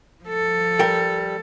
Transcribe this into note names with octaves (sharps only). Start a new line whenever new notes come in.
F3 A4
G3 A#4 G5